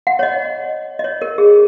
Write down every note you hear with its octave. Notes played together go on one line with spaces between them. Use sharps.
F#5
C#5
D#5
D#5
C#5
A#4
G#4